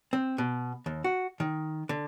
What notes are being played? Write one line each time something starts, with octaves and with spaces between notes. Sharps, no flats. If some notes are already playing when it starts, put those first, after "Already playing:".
C4
B2
D#2
F#4
D#3
D3